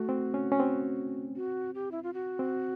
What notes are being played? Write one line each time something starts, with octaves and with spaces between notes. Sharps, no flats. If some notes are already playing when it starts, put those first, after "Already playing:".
Already playing: A3 F#4
C4
C#4
C#4
C4
F#4
G4
E4
F4
F#4
C4